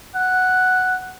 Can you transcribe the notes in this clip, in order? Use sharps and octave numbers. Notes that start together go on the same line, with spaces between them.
F#5